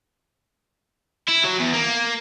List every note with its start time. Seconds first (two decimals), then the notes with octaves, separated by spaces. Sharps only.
1.28 E4
1.44 F#3
1.60 E2
1.74 A#3